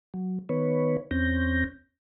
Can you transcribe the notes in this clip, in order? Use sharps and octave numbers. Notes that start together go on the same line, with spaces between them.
F#3
D#3 B3 B4 C#5
E2 C4 C#4 G6 A#6